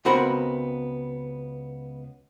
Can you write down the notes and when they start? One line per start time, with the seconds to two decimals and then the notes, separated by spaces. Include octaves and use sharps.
0.05 C#2 B3 C4 F#4 A#4 B5